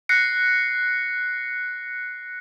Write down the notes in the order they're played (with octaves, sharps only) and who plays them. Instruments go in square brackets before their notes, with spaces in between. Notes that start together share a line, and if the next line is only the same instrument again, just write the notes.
[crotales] F#6 A#6 C7 C#7